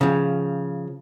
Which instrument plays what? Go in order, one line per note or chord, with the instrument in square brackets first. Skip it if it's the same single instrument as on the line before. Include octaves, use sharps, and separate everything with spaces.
[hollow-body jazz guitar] C#3 F3